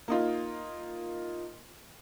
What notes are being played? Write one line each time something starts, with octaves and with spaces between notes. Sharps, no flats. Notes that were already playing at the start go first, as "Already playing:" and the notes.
A#3 D#4 F4